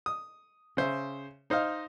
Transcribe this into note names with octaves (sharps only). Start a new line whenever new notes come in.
D#6
C#3 C5 E5
D#4 C5 D#5 F5